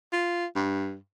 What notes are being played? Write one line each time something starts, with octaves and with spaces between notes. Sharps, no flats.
F4
G2